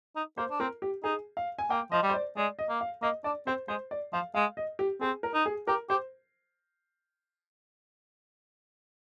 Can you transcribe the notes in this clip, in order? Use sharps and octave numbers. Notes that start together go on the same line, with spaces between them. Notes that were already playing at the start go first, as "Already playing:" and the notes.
D#4
A#3 C5
D4
C4 A#4
G4
D#4 G#4
F5
G#5
A#3 G5
F3 D#5
G3
C5
D5
G#3 D5
D#5
A#3
F5
A#3 D#5
D4 D5
C4 C5
G#3 C5
D5
F3 F5
G#3 F5
D#5
G4
C4 G#4
A#4
D#4
G#4
G4 A#4
G4 C5